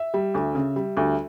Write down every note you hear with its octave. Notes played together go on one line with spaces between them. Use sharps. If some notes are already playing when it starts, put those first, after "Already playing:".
Already playing: E5
G3
D2
C#3
G3
D2